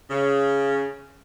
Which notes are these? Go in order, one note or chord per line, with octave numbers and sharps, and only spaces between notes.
C#3